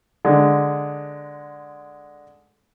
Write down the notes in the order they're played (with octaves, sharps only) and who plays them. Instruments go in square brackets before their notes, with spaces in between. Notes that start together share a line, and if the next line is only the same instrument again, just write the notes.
[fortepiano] D3 G#3